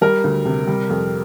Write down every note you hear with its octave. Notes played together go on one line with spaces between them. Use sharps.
G3 A#4
D2
C3
G3
F2